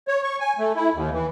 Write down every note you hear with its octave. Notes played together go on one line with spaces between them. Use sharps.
C#5
C#6
G#5
A3
E4
D#2
E3